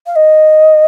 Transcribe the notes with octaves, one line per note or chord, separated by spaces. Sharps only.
F5
D#5